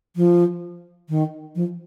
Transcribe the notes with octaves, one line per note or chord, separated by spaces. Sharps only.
F3
D#3
F3